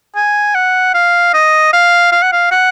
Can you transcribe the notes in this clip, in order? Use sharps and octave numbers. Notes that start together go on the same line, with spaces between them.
G#5
F#5
F5
D#5
F5
F5
F#5
F5
F#5